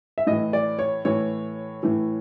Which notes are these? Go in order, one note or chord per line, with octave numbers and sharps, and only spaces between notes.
E5
A2 E3 D#5
D5
C#5
A2 E3 C#5
A2 E3